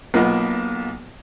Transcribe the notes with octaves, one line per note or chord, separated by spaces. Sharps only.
B1 A#3 B3 F4 D#5 F#5